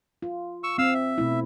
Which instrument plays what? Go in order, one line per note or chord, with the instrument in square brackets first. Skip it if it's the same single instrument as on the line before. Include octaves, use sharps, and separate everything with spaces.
[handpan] F4
[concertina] C#6 E6
[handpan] C4 [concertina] F5 E6
[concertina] E5
[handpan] B2 A3 E4